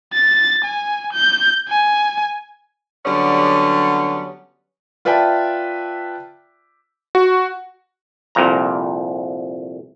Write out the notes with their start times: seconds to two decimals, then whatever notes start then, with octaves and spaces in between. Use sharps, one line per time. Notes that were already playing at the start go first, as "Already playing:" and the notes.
0.13 A6
0.64 G#5
1.13 G6
1.68 G#5
3.05 D3 F#3 G3 B3 C#4
5.05 F4 B4 D5 E5 G5 A5
7.15 F#4
8.35 C2 F2 A#2 A#5